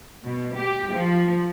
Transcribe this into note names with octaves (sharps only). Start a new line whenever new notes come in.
B2
G4
F3